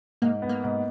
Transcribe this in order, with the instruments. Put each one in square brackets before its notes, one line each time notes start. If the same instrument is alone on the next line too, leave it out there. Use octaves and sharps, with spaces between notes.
[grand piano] G#2 [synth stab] A#3
[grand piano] B3
[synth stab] A#3
[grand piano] G#2